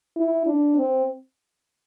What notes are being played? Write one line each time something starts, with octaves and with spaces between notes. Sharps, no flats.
E4
D4
C4